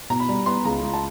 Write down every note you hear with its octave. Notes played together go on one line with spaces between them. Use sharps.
B2 A#5
B5
G3
B3 C6
C#2 A#5
C#2
A5